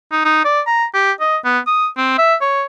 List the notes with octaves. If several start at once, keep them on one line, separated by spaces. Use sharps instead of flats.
D#4
D#4
D5
A#5
G4
D#5
B3
D#6
C4
E5
C#5